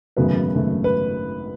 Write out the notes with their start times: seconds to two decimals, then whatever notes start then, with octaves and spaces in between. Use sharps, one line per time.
0.17 G#1 F#2 C#3 F#3 A3 B3 B4
0.54 G#1 F#2 C#3 F#3 A3
0.84 B4